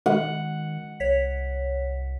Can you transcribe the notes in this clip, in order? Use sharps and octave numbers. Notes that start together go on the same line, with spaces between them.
D#3 F#5
C2 C#5 B6